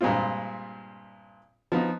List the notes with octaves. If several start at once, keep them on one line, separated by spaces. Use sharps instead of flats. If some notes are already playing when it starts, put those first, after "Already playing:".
G2 A#2 G#3 C4 F4
F3 B3 D#4